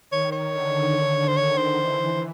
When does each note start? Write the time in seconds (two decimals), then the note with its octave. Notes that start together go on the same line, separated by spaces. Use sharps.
0.11 D#3 C#5
0.32 C#5
0.53 D3
1.28 C5
1.37 D#3 C#5
1.57 C5
1.78 E3